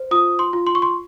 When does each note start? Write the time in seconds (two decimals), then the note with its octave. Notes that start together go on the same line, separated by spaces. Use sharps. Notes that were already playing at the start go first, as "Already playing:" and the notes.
Already playing: C5
0.11 F4 D#6
0.39 C6
0.53 F4
0.67 C6
0.75 C#6
0.82 C6